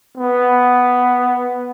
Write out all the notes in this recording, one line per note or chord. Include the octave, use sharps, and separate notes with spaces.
B3